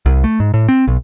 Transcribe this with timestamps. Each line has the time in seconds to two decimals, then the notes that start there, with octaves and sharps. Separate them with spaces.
0.06 C2
0.24 A3
0.40 G#2
0.54 A2
0.69 C4
0.88 B1